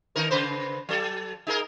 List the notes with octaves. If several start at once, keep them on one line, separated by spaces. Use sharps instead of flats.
D#3 D#4 A#4
C#3 B4 C5
F#3 A4
D#4 G#4 A#4